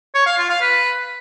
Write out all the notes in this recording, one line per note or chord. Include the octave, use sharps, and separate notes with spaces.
C#5
F5
F4
F5
B4